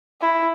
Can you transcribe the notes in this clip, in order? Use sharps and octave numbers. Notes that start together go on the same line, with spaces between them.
E4